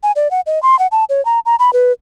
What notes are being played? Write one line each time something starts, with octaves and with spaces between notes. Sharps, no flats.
G#5
D5
F#5
D#5
C6
F#5
A5
C#5
A#5
A#5
B5
B4